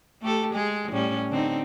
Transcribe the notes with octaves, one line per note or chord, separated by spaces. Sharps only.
A3 G4 A4
G#3 G#4
A2 G3 C#4
D3 C4 D#4